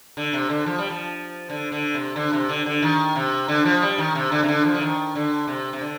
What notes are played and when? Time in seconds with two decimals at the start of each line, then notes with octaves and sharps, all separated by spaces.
0.17 D3
0.33 C3
0.49 D3
0.66 F3
0.78 G3
0.90 F3
1.50 D3
1.72 D3
1.94 C3
2.16 D3
2.33 C3
2.49 D3
2.66 D3
2.82 D#3
3.16 C3
3.48 D3
3.65 F3
3.82 G3
3.98 D#3
4.15 C3
4.32 D3
4.43 C3
4.48 D3
4.65 F3
4.74 D3
4.81 D#3
5.15 D3
5.47 C3
5.73 C3
5.81 D3